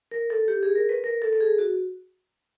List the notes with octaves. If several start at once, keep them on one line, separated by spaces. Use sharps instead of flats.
A#4
A4
G4
G#4
A#4
B4
A#4
A4
A4
G#4
F#4